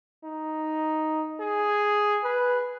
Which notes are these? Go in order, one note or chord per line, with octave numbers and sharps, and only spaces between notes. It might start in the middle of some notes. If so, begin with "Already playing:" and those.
D#4
G#4
B4